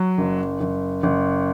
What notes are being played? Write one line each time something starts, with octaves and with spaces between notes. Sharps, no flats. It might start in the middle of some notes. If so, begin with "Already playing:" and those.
Already playing: F#3
F#1
F#1
F#1